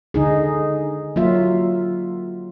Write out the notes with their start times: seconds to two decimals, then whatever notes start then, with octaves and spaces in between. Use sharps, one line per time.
0.14 D3 D#4 G#4
1.16 F#3 A#3 F4 E5